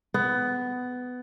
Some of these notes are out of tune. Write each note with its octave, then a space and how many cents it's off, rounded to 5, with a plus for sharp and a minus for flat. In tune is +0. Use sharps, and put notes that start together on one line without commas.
B3 +15